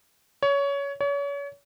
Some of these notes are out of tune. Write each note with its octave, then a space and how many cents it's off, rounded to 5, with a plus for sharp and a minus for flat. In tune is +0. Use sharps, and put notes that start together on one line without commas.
C#5 +20
C#5 +35